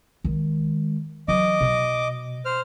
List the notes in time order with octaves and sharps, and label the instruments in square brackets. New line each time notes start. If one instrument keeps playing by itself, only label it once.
[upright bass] D#3 G#3
[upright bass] E3 F#3 [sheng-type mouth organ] D#5 D6
[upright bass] B2
[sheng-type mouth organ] C5 F6